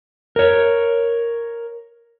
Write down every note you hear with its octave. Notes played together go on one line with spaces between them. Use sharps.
A#4 C#5